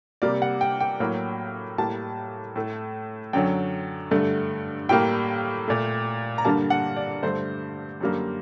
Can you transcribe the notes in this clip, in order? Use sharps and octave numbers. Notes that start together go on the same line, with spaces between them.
C3 G3 A#3 D5
F#5
G5
G5
A2 F#3 A#3
A2 G3 A#3 A5
A2 A3
F#2 D3 F#3 G5
G2 D3 A3
A2 G3 A#3 G5
A#2 A3
A#5
G2 D3 G3 A#3 A5
F#5
D5
G2 D3 A3 C5
F#2 D3 G3 A#3